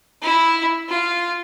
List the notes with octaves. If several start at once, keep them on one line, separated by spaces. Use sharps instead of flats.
E4
F4